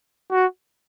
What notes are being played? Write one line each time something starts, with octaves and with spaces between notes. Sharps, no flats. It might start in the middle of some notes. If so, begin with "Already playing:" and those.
F#4